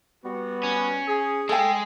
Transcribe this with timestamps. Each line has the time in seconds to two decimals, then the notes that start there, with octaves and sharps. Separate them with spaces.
0.23 G3 B3 F#4
0.63 C#4
1.07 G#4
1.49 G#3 A4 G5